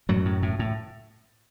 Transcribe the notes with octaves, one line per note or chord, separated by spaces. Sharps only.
F#2 A2 F#3
A2
A2
A2